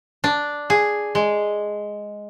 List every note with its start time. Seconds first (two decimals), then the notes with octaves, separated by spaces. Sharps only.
0.24 D4
0.70 G#4
1.15 G#3